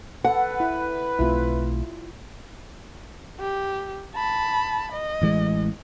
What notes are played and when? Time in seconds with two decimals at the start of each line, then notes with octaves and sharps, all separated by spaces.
0.25 A4 B4 F#5
0.60 E4
1.19 B1 A3 C4 E4 F4
3.40 G4
4.15 A5 B5
4.92 D#5
5.22 A1 E3 G#3